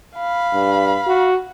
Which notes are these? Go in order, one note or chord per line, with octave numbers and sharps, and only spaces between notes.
F5 B5
G2
F#4